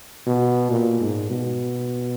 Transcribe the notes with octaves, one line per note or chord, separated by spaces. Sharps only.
B2
A#2
G#2
B2